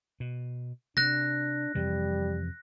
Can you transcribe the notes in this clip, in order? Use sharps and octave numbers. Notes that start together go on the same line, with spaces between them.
B2
C3 D4 F#6 A#6
F2 C3 E3 G3